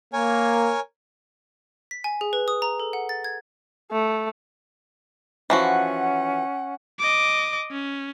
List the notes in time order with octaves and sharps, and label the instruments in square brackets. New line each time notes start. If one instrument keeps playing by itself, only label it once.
[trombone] A#3 [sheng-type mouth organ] A#4 C#5 G#5
[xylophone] B6
G#5
G#4
B4
D#6
A#5
A4
F#5
A6
G#6
[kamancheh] A3
[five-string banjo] E3 F3 F#4 [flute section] C#4 F#5
[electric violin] D#5 D6
C#4